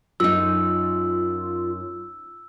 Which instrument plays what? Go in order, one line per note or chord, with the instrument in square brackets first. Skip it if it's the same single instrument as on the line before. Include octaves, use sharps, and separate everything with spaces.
[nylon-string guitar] F#2 D#4 [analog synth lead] F4 [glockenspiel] E6